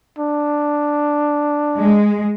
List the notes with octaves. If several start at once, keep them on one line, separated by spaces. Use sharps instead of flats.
D4
G#3